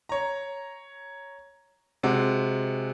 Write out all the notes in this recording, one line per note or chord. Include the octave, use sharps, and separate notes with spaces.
C#5 A#5
C3 G#3 F#4